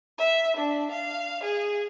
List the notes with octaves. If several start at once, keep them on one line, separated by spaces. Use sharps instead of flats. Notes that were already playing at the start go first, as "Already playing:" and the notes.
E5
D4
F5
G#4